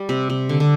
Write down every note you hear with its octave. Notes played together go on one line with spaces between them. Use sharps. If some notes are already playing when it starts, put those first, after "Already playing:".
Already playing: G3
C3
C3
D3
D3